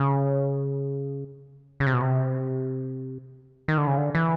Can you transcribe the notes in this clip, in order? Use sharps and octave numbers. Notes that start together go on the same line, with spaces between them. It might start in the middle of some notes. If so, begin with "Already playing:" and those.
Already playing: C#3
C#3
C3
B2
C3
D#3
D3
C#3
D3
E3